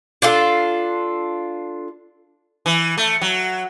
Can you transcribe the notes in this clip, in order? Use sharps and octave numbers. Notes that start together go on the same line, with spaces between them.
D4 F4 A4
E3
A3
F#3